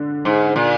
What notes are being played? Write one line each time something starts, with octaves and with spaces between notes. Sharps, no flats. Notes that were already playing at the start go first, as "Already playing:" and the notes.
Already playing: D3
G#2
A#2